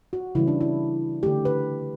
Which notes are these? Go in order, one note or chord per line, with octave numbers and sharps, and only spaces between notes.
F#4
C#3 E3 G3 E4
D4
E4
D3 A3 G4
B4